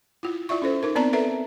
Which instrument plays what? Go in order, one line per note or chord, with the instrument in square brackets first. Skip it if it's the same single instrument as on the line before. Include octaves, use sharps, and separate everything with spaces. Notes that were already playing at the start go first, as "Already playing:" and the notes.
[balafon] E4 F4
E4 F4 D5 E5 C#6
C#4 A4 C5
D#4 A#4
B3 C4 D5 A5 A#5
A4 B4 D5 E5 A#5